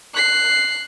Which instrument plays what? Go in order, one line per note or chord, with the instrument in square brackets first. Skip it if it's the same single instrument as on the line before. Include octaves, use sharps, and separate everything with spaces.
[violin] F#6 C7